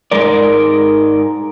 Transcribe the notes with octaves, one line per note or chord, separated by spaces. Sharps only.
G#2 G#3 A#4 D5